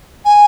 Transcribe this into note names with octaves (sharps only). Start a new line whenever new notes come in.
G#5